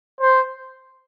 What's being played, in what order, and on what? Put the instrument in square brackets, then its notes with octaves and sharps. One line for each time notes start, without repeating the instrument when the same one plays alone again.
[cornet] C5